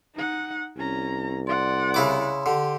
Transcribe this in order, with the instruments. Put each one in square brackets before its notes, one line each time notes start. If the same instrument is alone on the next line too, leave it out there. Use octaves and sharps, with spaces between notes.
[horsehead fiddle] D#4 F#5
[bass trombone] C2 [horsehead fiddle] C#4 A#5
[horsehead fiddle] D5 F#5 [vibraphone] C6
[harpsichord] C#3 E4 D6
[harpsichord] D3 [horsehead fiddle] G4